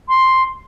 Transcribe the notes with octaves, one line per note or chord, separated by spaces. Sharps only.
C6